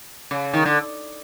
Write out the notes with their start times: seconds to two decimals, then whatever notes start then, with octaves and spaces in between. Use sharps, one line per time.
0.31 C#3
0.54 D#3
0.65 D3